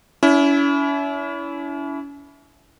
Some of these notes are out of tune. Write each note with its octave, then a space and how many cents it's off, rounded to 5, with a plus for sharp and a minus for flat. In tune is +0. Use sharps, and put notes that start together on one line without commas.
C#4 +40 E4 +0